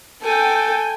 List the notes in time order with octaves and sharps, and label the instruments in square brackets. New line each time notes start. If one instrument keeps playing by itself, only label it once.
[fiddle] A4 [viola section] G5 G#5